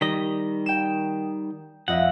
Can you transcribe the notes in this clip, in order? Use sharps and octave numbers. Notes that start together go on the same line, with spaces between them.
D#3 G3 D#5 B6
G5 E7
F2 D#5 E5 F#5